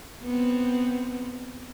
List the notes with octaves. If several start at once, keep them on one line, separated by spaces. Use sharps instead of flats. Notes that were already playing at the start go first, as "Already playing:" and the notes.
B3 C4